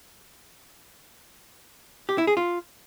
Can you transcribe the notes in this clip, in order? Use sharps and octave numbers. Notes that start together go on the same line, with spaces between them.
G4
E4
G#4
F4